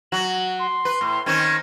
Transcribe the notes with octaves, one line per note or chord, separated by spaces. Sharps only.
F#3 F#4 F#7
C6
B4
A2
D#3 C4 C#4 G#6